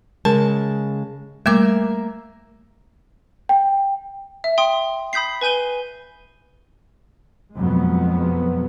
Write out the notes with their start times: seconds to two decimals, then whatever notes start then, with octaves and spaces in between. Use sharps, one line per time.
0.25 C#3 G#3 A#4 A5
1.46 G3 A3 A#3 E5 D6
3.49 G5
4.44 E5
4.58 G5 C6 D#6
5.13 B5 D#6 G6 B6 C7
5.41 B4 G#5 G6 D#7 G7
7.55 F2 B2 F#3 G#3 B3